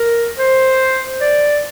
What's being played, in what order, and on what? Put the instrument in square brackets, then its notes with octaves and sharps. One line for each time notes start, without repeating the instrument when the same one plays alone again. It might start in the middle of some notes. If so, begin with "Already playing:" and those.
Already playing: [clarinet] A#4
C5
D5